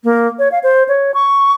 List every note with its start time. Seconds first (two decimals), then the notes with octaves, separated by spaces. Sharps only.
0.04 A#3
0.39 C#5
0.52 F5
0.63 C5
0.88 C#5
1.14 C#6